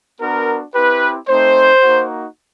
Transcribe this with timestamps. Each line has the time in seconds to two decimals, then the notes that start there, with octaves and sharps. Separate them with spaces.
0.20 B3 D4 F#4 A#4
0.74 C4 E4 G4 B4
1.28 A3 C4 D#4 C5
1.82 A#3 D#4 F#4